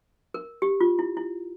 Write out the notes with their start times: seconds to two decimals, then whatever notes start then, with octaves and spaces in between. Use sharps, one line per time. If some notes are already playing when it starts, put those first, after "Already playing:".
0.34 A#4
0.62 G4
0.81 F4
0.99 E4
1.17 E4